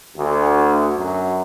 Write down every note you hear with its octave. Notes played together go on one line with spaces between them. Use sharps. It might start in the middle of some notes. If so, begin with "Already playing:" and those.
D2
F#2